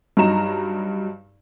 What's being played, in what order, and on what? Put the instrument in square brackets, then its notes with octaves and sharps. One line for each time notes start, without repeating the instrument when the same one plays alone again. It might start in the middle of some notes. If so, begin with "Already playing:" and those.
[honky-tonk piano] G2 F#3 D#4 A#5 E7